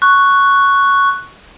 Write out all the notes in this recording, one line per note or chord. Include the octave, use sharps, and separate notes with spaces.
C#6 F#6